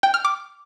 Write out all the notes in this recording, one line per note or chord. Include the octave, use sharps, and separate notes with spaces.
G5
F6
D6